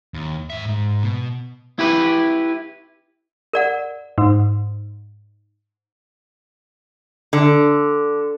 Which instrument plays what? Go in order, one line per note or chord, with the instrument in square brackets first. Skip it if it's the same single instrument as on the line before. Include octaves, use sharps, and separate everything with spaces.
[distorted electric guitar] D#2
G#2 E5
G#2
B2
[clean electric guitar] E4 G4 B4
[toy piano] A#4 D5 F#5
[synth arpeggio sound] G#2
[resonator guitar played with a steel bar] D3